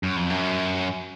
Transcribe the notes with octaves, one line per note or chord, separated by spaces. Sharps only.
F#2
F2
F#2